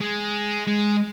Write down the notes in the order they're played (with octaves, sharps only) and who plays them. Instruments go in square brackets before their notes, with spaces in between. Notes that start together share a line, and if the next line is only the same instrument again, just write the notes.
[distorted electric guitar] G#3
G#3